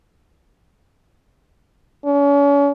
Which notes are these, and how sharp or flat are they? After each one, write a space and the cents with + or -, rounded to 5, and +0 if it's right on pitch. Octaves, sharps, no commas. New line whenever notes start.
C#4 +40